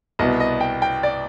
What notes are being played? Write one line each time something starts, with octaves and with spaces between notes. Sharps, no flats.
C2 B2 B3 D#5
D#5
G5
G5
D5